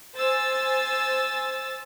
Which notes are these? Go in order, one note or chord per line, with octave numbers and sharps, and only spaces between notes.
C5 G#5 E6 A6